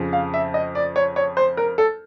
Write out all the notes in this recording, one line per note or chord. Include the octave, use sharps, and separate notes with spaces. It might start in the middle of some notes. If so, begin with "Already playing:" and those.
Already playing: F2 C#3 F3
F5
E5
D#5
D5
C#5
C#5
C5
A#4
A4